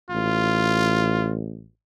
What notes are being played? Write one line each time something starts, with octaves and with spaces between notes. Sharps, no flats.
A1 F4